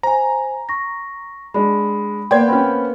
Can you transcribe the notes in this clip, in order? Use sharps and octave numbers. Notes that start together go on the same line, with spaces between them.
C5 G#5 A#5
C#6 A#6
G#3 D4 B5
A#3 B3 D5 G5 C6 G#6
C4 C#4 B5